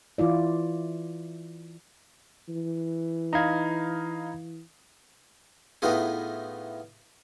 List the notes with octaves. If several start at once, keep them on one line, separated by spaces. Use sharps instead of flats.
E3 E4 F4 D5
E3
D#4 F5 A#5 B5 G#6
A2 E3 B3 D#4 F4 G#4